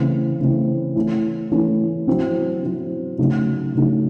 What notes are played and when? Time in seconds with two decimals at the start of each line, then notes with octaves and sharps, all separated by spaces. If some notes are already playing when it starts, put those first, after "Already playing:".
Already playing: C#3 E3 A3 C4 E4
0.40 C#3 E3 A3 C4 E4
0.95 E3 A3 C#4 E4
1.51 E3 A3 C#4 E4
2.08 F#3 C4 E4
2.63 F#3 C4 E4
3.18 C#3 F#3 A3 D#4
3.75 C#3 F#3 A3 D#4